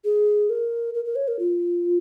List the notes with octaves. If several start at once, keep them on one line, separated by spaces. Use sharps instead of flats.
G#4
A#4
A#4
A#4
C#5
A#4
F4